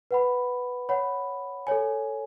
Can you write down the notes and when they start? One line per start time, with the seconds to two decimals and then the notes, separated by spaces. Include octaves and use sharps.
0.11 B4 F#5 B5
0.89 C#5 F#5 B5
1.67 A4 C#5 G#5